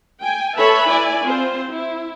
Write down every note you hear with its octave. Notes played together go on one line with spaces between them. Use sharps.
G5 G#5
A4 B4 C#5 E5 A5 B5
E4 D5 G#5
C4 F4 C5
E4